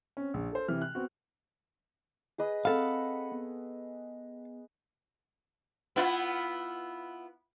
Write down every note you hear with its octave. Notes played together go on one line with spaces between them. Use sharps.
C4 C#4
A#1
A4 C5
C3 E3 F6
F#6
B3 C4 F#4
G#4 B4 D#5
C4 A4 F5 F#5 B5
B3
B3 E4 F4